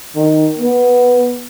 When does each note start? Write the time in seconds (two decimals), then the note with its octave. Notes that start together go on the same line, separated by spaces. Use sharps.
0.15 D#3
0.58 B3